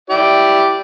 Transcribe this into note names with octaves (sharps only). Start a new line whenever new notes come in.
E4 G4 D5